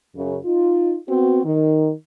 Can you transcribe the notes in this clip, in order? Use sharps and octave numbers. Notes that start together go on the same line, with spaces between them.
F#2 C#3
D#4 F4
B3 C4 F#4
D#3